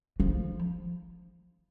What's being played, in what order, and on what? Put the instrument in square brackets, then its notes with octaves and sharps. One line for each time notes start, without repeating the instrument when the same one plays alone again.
[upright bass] F3